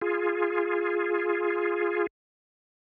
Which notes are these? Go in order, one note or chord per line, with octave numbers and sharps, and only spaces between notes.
F4 G#4